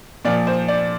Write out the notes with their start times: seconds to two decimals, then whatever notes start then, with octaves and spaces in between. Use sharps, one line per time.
0.25 A#2 F3 D5
0.47 C5
0.68 D5